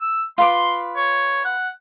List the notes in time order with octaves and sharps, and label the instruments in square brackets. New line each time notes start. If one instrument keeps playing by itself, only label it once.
[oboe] E6
[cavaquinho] F4 B4 D6 [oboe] C6
[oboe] C#5
F#5